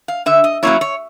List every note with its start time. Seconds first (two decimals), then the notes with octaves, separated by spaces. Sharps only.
0.08 F5
0.26 D3 E5
0.44 D#5
0.63 F#3 A#3 C#4 E4 C#5
0.81 C#5